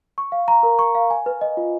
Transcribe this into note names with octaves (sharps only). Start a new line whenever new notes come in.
C#6
F5
A#5
A#4
C#6
F5
G#5
B4
D#5
F4